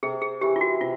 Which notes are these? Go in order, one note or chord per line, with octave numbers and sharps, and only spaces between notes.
C3 G#4
G#4
E3 G4
F4
F#4
C3 F4